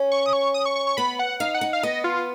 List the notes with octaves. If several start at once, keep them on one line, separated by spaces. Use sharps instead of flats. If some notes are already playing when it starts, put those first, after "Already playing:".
Already playing: C#4
C#6
D#6
C#6
D#6
C#6
C#6
C#6
B3 B5
F#5
D#4 F5
F#5
D#4
F5
B3 D#5
F4